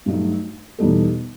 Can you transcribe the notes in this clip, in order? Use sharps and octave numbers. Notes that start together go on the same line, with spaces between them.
G2 F#3 A3 D#4
E2 B2 G3 D#4 A4